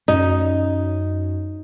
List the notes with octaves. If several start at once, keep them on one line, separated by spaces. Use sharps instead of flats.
F#2 C#4 D#4 F#4